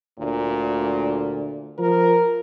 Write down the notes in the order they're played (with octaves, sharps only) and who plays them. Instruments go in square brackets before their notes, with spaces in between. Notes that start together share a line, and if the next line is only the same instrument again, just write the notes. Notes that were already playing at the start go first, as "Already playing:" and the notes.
[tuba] D2 [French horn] A#2
[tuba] F3 [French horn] A#4